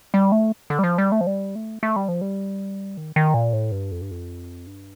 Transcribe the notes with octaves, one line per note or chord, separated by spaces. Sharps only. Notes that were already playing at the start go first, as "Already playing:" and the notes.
G3
A3
D3
G3
F3
G3
A3
F3
G3
A3
A3
G3
F3
G3
D#3
D#3
A#2
A2
G2
F2
G2
F2
G2